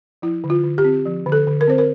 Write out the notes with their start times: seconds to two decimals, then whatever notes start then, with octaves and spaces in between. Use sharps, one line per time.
0.22 F3 E4
0.44 D3
0.50 F4
0.64 D3
0.78 G4
0.84 C4
1.06 F3
1.26 D3
1.32 A4
1.47 D3
1.61 A#4
1.67 C4 C5
1.78 A#4